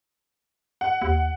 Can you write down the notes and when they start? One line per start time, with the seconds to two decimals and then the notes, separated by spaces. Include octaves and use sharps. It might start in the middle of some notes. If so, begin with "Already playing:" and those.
0.81 F#5
1.02 D#2